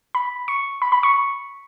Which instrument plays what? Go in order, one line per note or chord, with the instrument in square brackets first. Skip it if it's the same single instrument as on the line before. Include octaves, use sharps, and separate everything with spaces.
[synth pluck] B5
C#6
B5
B5
C#6